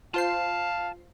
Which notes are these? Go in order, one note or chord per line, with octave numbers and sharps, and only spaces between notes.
F4 C5 F5 A5 C7